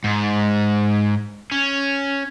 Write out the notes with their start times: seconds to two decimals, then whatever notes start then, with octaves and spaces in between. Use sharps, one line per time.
0.04 G#2
1.52 C#4